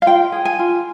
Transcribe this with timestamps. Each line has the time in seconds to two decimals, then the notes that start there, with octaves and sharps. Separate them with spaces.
0.02 F5
0.06 F4 G5
0.32 G#4
0.45 G#5
0.59 F4